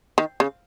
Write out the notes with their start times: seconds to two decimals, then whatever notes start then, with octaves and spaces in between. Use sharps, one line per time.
0.18 D#3
0.40 C#3